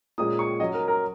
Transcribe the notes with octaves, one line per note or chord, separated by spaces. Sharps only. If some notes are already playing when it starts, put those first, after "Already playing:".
A#2 G#3 C#4 D#6
C#6
F#3 C#4 D#5
A#4
A#4